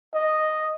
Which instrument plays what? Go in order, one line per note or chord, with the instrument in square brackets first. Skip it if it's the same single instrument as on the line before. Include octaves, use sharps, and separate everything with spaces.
[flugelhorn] D#5